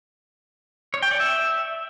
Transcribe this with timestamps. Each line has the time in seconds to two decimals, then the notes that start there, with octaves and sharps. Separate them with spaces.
0.94 C#5
1.02 G5
1.11 D5
1.20 E5